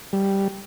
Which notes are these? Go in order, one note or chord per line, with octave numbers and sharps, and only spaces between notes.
G3